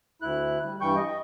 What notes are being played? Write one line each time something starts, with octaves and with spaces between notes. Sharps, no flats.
D2 E4 F#6
G3
G2 E3 G3 G5 C#6 G6
D#5